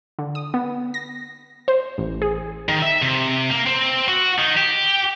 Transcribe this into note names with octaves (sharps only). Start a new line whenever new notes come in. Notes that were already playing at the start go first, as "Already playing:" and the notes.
D3
D#6
B3
A#6
C5
A1
G#4
D#3
E5
C3
A#3
C4
F#4
D#3
G4